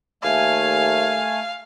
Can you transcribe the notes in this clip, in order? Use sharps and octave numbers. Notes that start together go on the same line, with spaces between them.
D#2 A3 F5 G#5